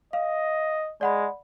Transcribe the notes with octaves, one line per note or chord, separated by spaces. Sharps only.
D#5 F5
G#3 D5 F#5 B5